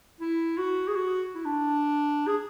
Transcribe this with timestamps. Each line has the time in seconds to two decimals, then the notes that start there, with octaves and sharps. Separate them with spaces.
0.21 E4
0.58 F#4
0.88 G#4
0.96 F#4
1.35 E4
1.45 D4
2.27 G#4